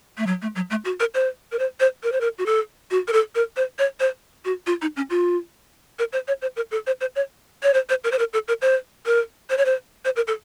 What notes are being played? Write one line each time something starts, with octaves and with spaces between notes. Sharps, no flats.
A3
F#3
A3
F#3
A3
F#4
A#4
C5
A#4
C5
C5
A#4
C5
A#4
F#4
A4
F#4
A#4
A4
A#4
C5
C#5
C5
F#4
F4
D#4
C#4
F4
A#4
C5
C#5
C5
A#4
A4
C5
C5
C#5
C#5
C5
C5
A#4
C5
A#4
A4
A#4
C5
A#4
C5
C#5
C5
C5
A#4
A4